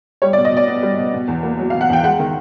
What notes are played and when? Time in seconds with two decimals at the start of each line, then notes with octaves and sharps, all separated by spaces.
0.22 G3 C#5
0.33 D5
0.38 B2
0.45 D#5
0.52 B2 D5
0.67 B3
0.83 G3
0.98 B2
1.14 B2
1.28 E2
1.43 A#3
1.59 F#3
1.70 F5
1.74 B2
1.81 F#5
1.89 E2 G5
2.04 G#3 F#5
2.20 D#3